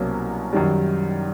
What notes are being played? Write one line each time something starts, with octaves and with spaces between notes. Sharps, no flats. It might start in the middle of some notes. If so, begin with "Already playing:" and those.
Already playing: C2 B2 F#3 A#3 C#4
F#2 D#3 G3